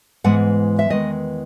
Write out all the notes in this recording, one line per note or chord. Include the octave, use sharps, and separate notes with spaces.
G#2 E3 G#3 B3 F#5
E5
E2 D#3 G#3 B3 D#5